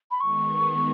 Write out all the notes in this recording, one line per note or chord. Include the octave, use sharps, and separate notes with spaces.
B5
D#3 G#3 B3 C#6